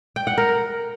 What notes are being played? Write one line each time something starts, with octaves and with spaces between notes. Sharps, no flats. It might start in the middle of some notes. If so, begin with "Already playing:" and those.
G5
F#5
A#4